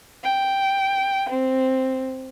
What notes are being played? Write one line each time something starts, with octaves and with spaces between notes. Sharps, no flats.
G5
C4